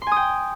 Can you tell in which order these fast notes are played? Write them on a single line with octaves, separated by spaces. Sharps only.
C6 G#5 D#6 G5